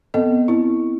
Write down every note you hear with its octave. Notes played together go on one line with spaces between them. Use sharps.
B3 C4 A4 D#5
C4 E4